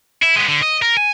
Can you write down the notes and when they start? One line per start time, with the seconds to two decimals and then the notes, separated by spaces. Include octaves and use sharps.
0.22 E4
0.36 G#3 B3
0.48 D3
0.62 D#5
0.82 A#4
0.97 G#5